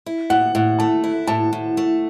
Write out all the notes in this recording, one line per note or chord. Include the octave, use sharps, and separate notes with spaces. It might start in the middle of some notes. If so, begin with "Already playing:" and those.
E4
A2 F#5
A2 F#5
A3 A5
E4
A2 A5
A2
A3